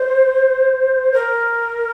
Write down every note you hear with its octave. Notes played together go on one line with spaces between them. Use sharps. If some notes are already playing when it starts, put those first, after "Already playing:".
Already playing: C5
A#4